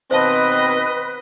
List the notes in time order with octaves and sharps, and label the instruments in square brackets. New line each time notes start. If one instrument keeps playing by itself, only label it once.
[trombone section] B2 D#3 C4 [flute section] B4 [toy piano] C5 F5 A5 [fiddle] D#5